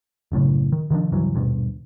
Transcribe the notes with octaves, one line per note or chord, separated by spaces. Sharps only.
F#1 F#2 A2 C#3
D#3
C3 D#3 F3 D4
C#2 G2 E3 F#3
D#1 G2 B2